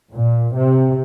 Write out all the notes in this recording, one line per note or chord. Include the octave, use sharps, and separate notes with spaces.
A#2
C3